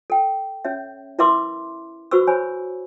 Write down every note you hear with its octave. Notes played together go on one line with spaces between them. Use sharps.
A4 G5
C#4 C#5 E5
E4 A#4 B4 E5 C6 D6
F#4 B4 C5 C#6 E6
C5 C#5 G#5 B5